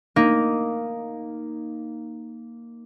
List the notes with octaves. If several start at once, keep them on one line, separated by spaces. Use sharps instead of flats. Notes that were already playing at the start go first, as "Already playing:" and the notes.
A#3 D#4